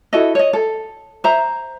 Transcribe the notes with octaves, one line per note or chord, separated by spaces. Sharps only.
E4 F#4 A4 D#5
C#5 D#5
A4
C5 E5 A#5